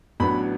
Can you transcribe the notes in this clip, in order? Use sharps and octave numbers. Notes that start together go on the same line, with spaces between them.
A1 A2 F#3 B3 D4 B5